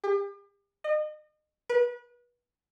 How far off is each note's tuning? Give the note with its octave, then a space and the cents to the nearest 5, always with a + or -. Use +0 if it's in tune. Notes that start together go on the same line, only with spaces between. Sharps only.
G4 +40
D#5 -35
B4 -30